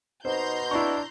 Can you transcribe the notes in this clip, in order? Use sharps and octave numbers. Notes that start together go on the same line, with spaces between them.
B2 D#4 C5 A#5 C6 G6
D4 E4 C#6